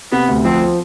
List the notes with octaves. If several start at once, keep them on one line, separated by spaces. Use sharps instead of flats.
C3 B3
D2
F3 C4